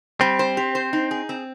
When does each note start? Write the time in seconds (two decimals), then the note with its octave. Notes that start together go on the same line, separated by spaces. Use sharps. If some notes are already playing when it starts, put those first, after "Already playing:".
0.21 G3 C4
0.39 C5
0.57 G4
0.75 C5
0.93 D#4
1.11 G#4
1.29 C4